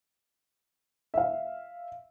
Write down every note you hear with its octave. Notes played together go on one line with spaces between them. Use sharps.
E5 F5